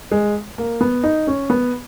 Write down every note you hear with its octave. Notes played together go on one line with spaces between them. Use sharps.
G#3
A#3
B3
D#4
C#4
B3